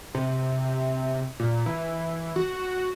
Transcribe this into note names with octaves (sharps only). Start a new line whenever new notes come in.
C3
A#2
E3
F#4